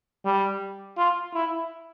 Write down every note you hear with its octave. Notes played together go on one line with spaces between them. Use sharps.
G3
F4
E4